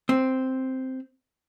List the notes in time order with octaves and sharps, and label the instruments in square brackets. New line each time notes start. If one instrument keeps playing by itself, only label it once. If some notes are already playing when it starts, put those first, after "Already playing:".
[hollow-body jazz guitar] C4